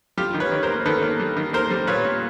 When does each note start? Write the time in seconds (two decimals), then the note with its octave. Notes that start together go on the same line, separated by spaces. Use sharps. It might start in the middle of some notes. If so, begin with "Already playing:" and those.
0.17 G3 F4 G4
0.34 D#3
0.40 B4 C#5
0.52 D#3
0.63 A#4 C5
0.69 A#3
0.86 D#3 A4 B4
1.03 A#3
1.20 G3
1.37 D#3
1.53 A#3 A#4 C5
1.70 G3
1.87 A#2 B4 C#5
2.05 A#2